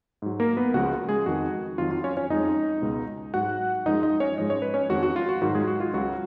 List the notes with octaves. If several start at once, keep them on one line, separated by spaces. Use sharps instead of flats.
G#2 F#3
A#3 A#4
B3 B4
C#2 C#3 F3 G#3 F#4 F#5
G#3 G#4
F2 D#3 G#3 F#4
F2 D#3 F#3 F4
F4
C#4 C#5
C#4 C#5
F2 F3 G#3 D#4 D#5
C#2 B2 G#3
G#2 F#3 F#4 F#5
F#2 F3 G#3 D#4 D#5
D#4 D#5
C#4 C#5
G#2 F3 G#3 D#5
C#5
B4
C#4 C#5
F2 D#3 G#3 F#4
F#4
F4
F#4
G#2 D#3 F#3 F#4
G#3 G#4
F#4
F4
C#2 C#3 F#3 F#4